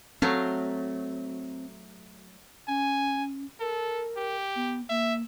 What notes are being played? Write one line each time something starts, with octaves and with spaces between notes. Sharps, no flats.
F#3 A3 C4 F5
C#4 G#5
A4 A#4
G4
B3
A#3 E5